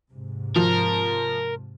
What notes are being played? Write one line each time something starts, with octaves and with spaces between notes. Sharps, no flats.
G#2 C3
F3 A#4